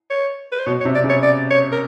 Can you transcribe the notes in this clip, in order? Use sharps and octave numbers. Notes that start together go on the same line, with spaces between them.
C#5
B4
C5
B2 C#5
C#5
C3
D5
C#3
C#5
D5
C#5
A#4